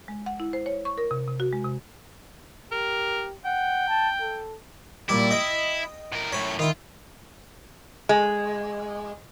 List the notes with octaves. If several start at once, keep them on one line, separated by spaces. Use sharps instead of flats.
G#3
F#5
E4
C5
C#5
C#6
A#4
C3
C3
F#4
G#3
C3
G4 A#4
F#5 G5
A5
A4
A#2 G3 E4 G4
D#5 G5
A2 A#4
F#2 A2 C#5 B5
D#3 E4 F4
G#3